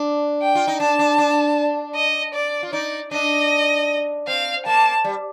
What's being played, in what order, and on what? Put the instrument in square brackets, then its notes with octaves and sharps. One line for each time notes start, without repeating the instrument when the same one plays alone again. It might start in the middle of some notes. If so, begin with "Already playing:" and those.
Already playing: [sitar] D4
[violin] G5
[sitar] F4
D#4
[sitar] D4 [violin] A5
[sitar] D4
D4
[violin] D#5
D5
[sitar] F4
[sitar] D#4 [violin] D5
[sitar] D4 [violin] D#5
[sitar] C4 [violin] F5
[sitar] A#3 [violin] A5
[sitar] G3